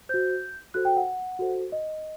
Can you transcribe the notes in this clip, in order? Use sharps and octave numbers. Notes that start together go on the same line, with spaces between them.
F#4 C5 G6
F#4 A4 C5 F#6
G5
F#5
F#4 A4 C5
D#5